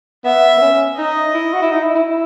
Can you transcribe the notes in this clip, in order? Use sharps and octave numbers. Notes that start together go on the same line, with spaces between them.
B3 E5
B3
C#4
D#4 D#5
E4
F#4
E4
D#4
E4
E4